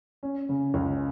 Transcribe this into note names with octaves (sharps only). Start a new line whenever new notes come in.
C#4
C#3
C#2